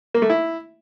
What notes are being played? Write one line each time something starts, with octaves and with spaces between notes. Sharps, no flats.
A#3
A3
E4